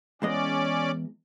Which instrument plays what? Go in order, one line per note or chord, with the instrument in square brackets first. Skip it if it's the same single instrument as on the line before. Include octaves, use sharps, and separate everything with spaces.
[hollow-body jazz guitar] E2 G#3 D#5 [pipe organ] C#4 D5